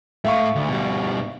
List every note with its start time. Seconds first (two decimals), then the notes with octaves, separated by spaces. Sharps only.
0.24 A2 A3 E5 F5 C#6
0.56 D2
0.69 B2 G3